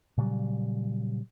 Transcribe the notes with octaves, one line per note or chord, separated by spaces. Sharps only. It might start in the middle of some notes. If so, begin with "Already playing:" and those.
A#2 C#3 F#3 G3